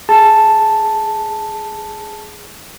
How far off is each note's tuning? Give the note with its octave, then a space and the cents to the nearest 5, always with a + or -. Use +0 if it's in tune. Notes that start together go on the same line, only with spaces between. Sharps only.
G#4 +0 A5 +0